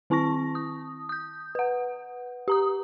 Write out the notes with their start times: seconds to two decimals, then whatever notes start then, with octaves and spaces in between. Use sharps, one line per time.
0.10 D#3 C4 E4 A5 C#6 A#6
0.55 D#6
1.09 D#6 G6
1.55 B4 F#5
2.48 G4 A#5 D#6